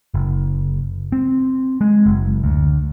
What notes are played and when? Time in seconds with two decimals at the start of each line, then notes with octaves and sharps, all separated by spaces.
0.14 F#1
1.12 C4
1.81 G#3
2.06 F#1
2.44 D2